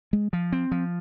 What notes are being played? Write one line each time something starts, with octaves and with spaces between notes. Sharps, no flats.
G#3
F3
C4
F3